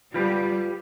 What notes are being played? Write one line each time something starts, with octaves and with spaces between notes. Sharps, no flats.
G3 F4 G4 B4